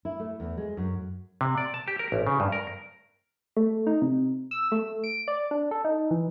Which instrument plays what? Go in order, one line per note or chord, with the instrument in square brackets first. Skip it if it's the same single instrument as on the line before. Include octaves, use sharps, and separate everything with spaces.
[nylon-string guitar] E4
A3
E2
G#3
F#2
[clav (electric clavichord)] C3
D5
A5
G4
A#4
A1
C#3
G2
A#4
[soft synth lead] A3
D#4
C3
E6
A3
D7
D5
D4
A4
D#4
E3